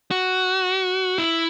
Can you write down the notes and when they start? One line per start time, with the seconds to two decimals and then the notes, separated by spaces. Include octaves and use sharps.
0.11 F#4
1.18 E4